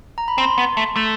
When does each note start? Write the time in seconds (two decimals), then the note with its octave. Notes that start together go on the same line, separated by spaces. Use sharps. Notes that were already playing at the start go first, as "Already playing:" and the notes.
0.18 A#5
0.28 B5
0.38 C4 A#5 C6
0.58 B3
0.77 A3
0.96 A3